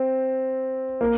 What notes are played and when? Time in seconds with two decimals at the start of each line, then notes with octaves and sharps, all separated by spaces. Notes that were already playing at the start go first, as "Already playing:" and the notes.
Already playing: C4
1.01 A#3